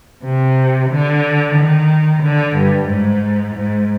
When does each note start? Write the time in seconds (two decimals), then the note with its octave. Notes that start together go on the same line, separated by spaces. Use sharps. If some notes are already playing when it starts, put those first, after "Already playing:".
0.24 C3
0.90 D3
1.57 D#3
2.23 D3
2.57 G2
2.89 G#2
3.56 G#2